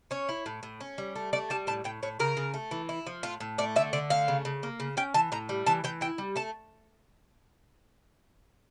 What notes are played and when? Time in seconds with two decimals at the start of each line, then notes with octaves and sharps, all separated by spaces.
0.11 C#4 C#5
0.29 E4
0.46 A2
0.63 A2
0.80 C#4
0.98 G3
1.16 A3
1.33 A3 D5
1.50 G3 A5
1.67 A2 A5
1.84 A2 G5
2.03 A2 C#5
2.20 C#3 A#4
2.37 C#3
2.54 A3
2.71 E3
2.89 E4
3.07 F3
3.23 A2 F4
3.40 A2
3.58 A3 D5
3.76 D3 E5
3.93 D3 D5
4.10 A3 F5
4.28 C#3
4.45 C#3
4.63 A#3
4.80 C#3
4.97 C#4 G5
5.14 E3 A5
5.32 A2 A#5
5.49 G3
5.66 E3 A5
5.84 E3 G5
6.01 E4 G5
6.18 G3
6.36 A3 A5